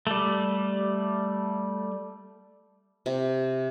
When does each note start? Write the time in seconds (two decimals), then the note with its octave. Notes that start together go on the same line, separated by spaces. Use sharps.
0.07 G3 A3
3.06 C3